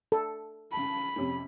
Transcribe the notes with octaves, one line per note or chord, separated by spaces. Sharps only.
A4
C#3 A5 B5
F2 C3 C#4